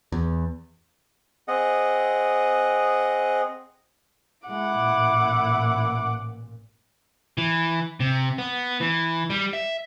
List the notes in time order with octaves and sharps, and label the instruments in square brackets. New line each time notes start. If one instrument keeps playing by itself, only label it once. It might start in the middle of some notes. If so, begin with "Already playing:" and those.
[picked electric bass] E2
[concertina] C4 G#4 D#5 F#5
[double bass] G#3 [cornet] E4 [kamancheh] F#5 D6
[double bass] A1 A#2
[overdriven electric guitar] E3
C3
B3
E3
G3
E5